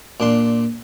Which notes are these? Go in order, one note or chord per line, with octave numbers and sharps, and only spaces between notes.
A#2 D4 C6